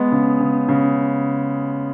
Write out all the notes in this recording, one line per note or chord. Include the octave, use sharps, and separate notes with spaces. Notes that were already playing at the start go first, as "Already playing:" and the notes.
Already playing: G#3 B3
C#3
C#3
C#3